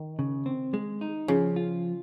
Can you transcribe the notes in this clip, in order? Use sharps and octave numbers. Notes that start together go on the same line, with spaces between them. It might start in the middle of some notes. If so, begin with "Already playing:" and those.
Already playing: D#3
C#3
C4
G#3
D#4
C#3 F3
F4